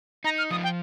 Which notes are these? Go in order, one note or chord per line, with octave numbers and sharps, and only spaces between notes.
D#4 A#5
F6
F3 D#6
G5